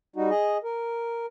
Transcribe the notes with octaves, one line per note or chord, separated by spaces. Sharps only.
G3 D#4 F#4
G#4 D#5
A#4